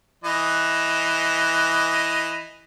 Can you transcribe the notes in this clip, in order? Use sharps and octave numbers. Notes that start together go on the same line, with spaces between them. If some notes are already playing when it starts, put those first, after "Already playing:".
E3 D#5